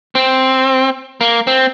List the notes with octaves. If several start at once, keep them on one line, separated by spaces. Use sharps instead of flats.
C4
A#3
C4